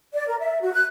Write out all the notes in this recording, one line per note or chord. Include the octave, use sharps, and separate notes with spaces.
D5
A#4
E5
F#4
F#6